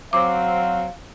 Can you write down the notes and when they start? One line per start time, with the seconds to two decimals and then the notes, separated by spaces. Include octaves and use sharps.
0.13 F#3 C4 F5 D6